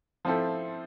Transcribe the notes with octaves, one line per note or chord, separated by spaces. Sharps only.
F3 C4 E4 A4